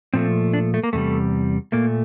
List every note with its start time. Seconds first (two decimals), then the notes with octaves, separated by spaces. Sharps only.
0.14 A#2 F3 A3 C4
0.54 D4
0.74 A3
0.83 A#3
0.93 E2 C3 G3 A3
1.72 A#2 A3 A#3